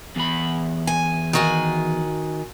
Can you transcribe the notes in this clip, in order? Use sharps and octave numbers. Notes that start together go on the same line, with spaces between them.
E2 B5
G#5
D#3 F#4 G#5